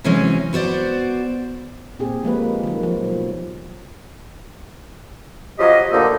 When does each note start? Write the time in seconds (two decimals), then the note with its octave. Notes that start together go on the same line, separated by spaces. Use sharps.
0.04 C3 E3 F#3 G#3 C#4
0.53 B3 F#4 C5 D5
1.99 A#2 C4 G4 G#4
2.23 F3 G#3 A#3 B4
2.63 D#3 F#3
2.83 F3
3.03 B2 F#3
5.59 C#3 F3 F#3 G4 D#5
5.92 D2 A#2 D3 A#3 D#4 E6